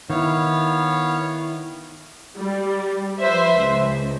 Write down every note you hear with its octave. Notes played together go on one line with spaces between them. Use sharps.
D#3 B3 E4 C#5 F5
G3
F3 B4 C5 E5
C#2